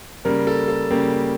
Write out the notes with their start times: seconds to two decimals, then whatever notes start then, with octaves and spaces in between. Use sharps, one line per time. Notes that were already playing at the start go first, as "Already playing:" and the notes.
0.25 C#3 G3 A#3 A#4
0.47 A4
0.68 A4
0.91 C#3 G3 A#3 G4